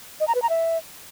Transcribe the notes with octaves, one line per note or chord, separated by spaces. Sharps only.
D#5
A#5
B4
A#5
E5